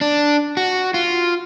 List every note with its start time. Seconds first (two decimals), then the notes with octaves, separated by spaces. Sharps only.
0.01 D4
0.57 F#4
0.94 F4